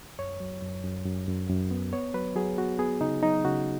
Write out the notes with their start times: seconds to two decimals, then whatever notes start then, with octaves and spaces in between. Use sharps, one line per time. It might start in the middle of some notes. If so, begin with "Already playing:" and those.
0.19 F#2 C#5
0.40 F#3
0.62 F#2
0.84 F#2
1.06 F#2
1.28 F#2
1.49 F#2
1.71 B3
1.93 B3 C#5
2.14 F#3 B4
2.35 F#3 G#4
2.58 B3 F#4
2.79 B3 G#4
3.01 C#3 D#4
3.22 F#3 D#4
3.45 C#3 F#4